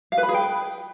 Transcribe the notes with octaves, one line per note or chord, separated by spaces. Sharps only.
F5
B4
B5
G#4
G5